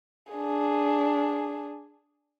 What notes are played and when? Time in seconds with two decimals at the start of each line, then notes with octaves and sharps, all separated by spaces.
0.32 D4 G#4